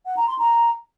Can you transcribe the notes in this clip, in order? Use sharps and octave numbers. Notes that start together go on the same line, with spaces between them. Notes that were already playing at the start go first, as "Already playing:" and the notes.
F#5
A#5
C6
A#5